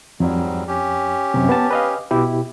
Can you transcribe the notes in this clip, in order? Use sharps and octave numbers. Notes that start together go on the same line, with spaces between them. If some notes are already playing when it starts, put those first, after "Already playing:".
F2 G#2 F#3 G3
C#4 G4
F#2 C3
B3 A5
B4 D#5 F5
B2 E4 G4